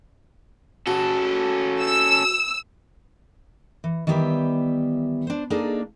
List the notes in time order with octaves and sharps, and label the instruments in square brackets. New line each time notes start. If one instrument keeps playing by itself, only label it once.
[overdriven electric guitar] C#4 A4 [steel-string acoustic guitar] F#4 G#4
[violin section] E6
[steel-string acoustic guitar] E3
D#3 E3 G3 B3 G4 E5
D4 C5
A#3 D4 D#4 G#4 A4